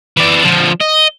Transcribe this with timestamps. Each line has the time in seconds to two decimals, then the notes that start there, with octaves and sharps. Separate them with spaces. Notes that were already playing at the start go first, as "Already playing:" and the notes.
0.17 E3 D5
0.44 D3 F3
0.80 D#5